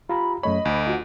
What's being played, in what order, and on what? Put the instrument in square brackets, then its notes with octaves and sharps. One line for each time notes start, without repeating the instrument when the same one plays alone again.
[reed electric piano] F4 G4 A#5 [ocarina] B5
[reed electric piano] F#2 A3 C#5 [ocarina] D#5 [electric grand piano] B5
[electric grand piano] D2 [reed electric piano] B5
[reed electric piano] F4 F#4